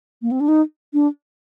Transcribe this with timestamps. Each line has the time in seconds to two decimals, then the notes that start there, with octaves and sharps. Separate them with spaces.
0.22 A#3
0.31 C4
0.40 D4
0.48 D#4
0.94 D4